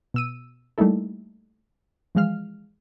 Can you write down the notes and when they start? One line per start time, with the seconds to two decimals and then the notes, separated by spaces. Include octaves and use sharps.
0.14 B2 E6 D#7
0.78 G3 A3 A#3 D#4 E4 A4
2.15 E3 F3 G#3 F5 F6